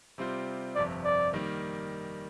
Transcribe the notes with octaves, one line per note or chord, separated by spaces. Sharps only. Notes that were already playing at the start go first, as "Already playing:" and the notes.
C3 G3 C4 F4 C5
G1 F2 C3 D5
D5
D#3 G3 A#3